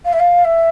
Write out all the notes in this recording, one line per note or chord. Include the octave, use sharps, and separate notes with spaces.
F5
E5
F5
E5